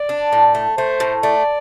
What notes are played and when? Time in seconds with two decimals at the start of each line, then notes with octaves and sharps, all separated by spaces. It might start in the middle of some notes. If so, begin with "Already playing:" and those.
Already playing: D5
0.09 D4
0.33 A2
0.55 A3
0.77 A3 C5
1.00 A2
1.23 A3 D5